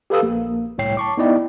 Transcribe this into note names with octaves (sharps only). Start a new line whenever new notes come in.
G4 A4 B4 F5 D#6 E6
A#1 A#3
G1 C2 A2 C#5 G5 C7
A5 C#6 D6
B3 D#4 E4 D5 D#5 G5